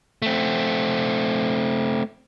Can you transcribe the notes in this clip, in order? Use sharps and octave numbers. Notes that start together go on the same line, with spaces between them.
A3 C4